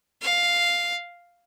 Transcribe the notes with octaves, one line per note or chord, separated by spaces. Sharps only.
F5